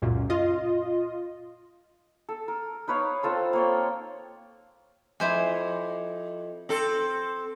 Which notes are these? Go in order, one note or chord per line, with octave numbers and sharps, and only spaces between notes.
C#2 F#2 A#2
F4 D#5
A4
A#4
D#4 B4 C#5 F5
C4 F4 A4 C5
A#3 C#5 G5
F2 E4 C5 G#5
C4 A4